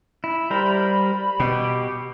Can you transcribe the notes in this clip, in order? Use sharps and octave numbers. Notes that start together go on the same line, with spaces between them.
E4
G3 A#4 C5 B5
B2 G4